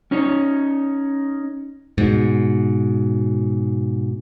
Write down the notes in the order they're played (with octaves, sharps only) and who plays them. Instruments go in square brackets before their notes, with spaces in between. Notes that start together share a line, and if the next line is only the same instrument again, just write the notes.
[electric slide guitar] C#4 D#4 C#5
[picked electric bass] G#2 B2